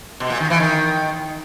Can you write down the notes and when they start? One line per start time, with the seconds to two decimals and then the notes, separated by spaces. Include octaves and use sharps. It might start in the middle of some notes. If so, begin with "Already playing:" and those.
0.20 B2
0.30 A#2
0.40 D#3
0.50 E3
0.60 D#3